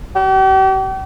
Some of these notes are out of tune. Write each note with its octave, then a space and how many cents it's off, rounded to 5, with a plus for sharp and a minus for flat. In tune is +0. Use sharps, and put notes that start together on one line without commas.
G4 -40